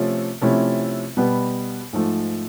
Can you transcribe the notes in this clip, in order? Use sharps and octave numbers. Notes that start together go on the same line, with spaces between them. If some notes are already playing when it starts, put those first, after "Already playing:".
Already playing: C3 F3 A3 C#4
C3 F3 A3 C#4 E4
B2 G3 B3
G#2 F3 A3